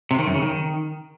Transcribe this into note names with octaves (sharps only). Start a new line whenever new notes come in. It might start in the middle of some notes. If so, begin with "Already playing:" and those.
C3
D#3
F#2
C#3
D#3